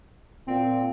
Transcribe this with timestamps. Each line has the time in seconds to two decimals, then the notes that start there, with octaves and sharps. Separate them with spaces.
0.48 A#2 C4